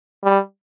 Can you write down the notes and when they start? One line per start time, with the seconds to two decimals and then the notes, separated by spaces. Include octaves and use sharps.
0.24 G3